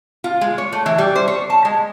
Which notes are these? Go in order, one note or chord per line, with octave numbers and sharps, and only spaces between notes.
F4
G#3
C#5
A3
E3
G3
C5
C#5
A5
G#3